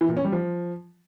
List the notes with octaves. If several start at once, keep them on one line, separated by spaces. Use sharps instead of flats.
E3
A#2
C#4
G3
F3